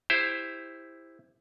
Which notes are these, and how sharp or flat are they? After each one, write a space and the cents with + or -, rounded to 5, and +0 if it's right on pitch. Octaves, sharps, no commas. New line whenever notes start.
E4 +0 G4 +25 C5 +0